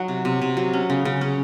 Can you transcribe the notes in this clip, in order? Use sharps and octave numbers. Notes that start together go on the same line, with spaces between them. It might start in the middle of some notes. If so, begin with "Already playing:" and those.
Already playing: F#3 D#4 F#4
C3
C3
C3
F#3
C#4
C#3
C#3
C#4